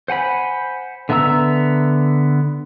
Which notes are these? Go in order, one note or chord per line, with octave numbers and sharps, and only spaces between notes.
C5 F#5 G#5 B5
D3 B3 E5 A#5 E6